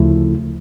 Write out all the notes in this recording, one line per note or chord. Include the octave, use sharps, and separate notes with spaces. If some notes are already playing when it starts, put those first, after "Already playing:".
Already playing: D2 C#3 F3 A3 E4